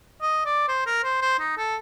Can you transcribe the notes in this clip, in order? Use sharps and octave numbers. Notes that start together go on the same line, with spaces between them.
D#5
D5
C5
A#4
C5
C5
D#4
A4